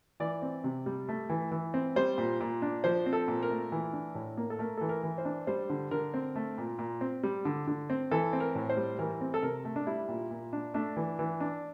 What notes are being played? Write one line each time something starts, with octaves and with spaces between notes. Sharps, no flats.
E3 D5
C4
C3
G3
A3
E3
E3
C4
G3 C5
A#2
A#2
D4
F3 C5
C4
A4
A#2
A#4
A3
E3
D4
A2
A#3
A4
A3 A#4
E3 A4
A#4
E3
C5
D4
G3 C5
D3
D3 A#4
C4
A3
A#2
A#2
C4
G3
D3
D3
C4
E3 A4
C4
A#4
A2
C5
G3
E3 A#4
C4
A4
C3 A#4
A3
D4
G3 E4
A#2
A#2
D4
A3 D4
E3
E3
D4